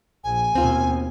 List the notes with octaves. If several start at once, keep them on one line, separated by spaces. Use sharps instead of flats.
A#1 G#5
D#2 B2 C4 F4